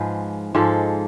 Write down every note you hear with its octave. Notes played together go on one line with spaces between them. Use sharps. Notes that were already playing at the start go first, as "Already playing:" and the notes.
Already playing: G#2 F3 G#3 B4
G#2 F3 G#3 A4